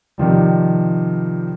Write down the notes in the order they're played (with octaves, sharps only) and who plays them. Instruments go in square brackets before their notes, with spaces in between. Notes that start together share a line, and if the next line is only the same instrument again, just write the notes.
[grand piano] C3 D#3 F3 G3